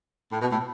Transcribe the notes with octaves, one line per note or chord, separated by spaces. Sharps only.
A2
B2
A2